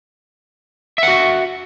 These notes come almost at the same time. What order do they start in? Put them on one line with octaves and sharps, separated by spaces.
E5 F#5 F#4